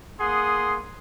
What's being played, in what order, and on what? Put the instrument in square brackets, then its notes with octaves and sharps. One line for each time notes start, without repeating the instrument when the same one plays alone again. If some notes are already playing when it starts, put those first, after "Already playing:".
[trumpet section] A#3 G#4 F#5 C6 D#6